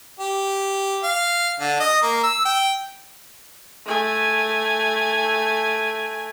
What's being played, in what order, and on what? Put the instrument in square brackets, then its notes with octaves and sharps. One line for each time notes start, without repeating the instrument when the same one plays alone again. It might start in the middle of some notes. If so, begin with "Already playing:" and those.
[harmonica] G4
F5
D3
D#5
A#3
E6
G5
[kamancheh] A3 G#5